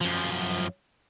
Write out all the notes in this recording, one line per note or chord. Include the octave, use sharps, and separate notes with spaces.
F#2 F3